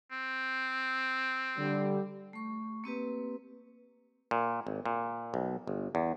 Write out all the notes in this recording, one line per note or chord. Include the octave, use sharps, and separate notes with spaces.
C4
D3 G3
A3 C#6
A#3 C4 G4 B4
A#2
G#1
A#2
B1
G1
E2